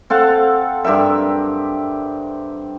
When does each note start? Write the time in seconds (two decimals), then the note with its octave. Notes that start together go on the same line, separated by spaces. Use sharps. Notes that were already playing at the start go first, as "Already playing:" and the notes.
0.10 C4 A4 F5 F#5
0.84 G2 G4 A#4 E5